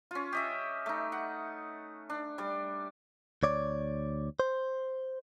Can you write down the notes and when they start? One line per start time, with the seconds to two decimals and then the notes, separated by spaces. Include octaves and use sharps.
0.11 C#4 F4
0.33 G4 D#5 E5
0.86 A3 D#4
1.12 F#5
2.10 D4
2.38 G3 D5
3.43 D2 C#5 D5
4.40 C5